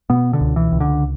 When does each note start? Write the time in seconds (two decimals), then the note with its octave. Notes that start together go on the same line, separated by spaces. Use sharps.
0.10 B2 B3
0.33 D3
0.41 C#2
0.56 E3
0.72 C#2
0.80 D3